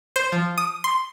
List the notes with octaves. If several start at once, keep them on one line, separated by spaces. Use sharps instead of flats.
C5
F3
D#6
C6